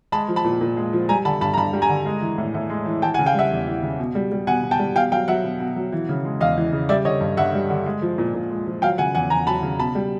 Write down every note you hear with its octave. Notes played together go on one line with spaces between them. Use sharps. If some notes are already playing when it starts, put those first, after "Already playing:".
G#3 A5 B5
F3
A5 B5
A#2
A#2
G#3
F3
G3 G#5 A#5
D3 A5 B5
G2 A5 B5
A#5
G2 A5 B5
G3
G#5 A#5
D3
G#3
E3
A2
A2
G#3
E3
E3 G5 A5
F#5 G#5
C#3
F5 G5
G3 E5 F#5
E2
E3
C#3
B2
G3
G3
B2 F#5 G#5
B2
G5 A5
G3
B2 F5 G5
F#3 F5 G5
F#3 E5 F#5
B2
B2
F#3
E3
C#3
G#3
E2 D#5 F5
E3
C#3
G3 D5 E5
D3 C#5 D#5
G2
G2 E5 F#5
G3
D3
G#3
F3
A#2
A#2
G#3
F3
F#3 F5 G5
C#3 F#5 G#5
E2 F#5 G#5
E2 G#5 A#5
F#3 A5 B5
C#3
B2 A5 B5
G3